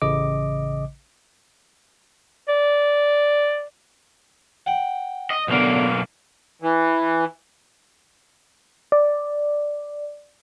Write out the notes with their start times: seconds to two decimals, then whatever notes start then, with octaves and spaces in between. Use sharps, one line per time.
0.02 A1 C#3 D#5 D6
2.48 D5
4.66 F#5 G5
5.30 D#5
5.48 B1 E2 D3 A#3
6.62 E3
8.92 D5